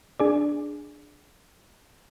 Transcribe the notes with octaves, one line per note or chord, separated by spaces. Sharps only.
D4 G#4 D5